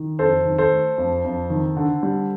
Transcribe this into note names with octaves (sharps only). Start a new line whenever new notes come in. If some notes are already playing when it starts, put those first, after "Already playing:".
Already playing: D#3
F2 A4 C5
D#3
A4 C5
A3
F2
F2
D#3
D3
G3